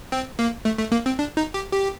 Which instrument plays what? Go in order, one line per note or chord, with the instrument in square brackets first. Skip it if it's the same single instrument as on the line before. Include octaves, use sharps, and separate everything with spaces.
[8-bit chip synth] C4
A#3
A3
A3
A#3
C4
D4
D#4
G4
G4